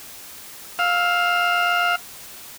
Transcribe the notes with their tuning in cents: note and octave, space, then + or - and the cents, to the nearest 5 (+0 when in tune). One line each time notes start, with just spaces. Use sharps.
F5 +10 E6 +0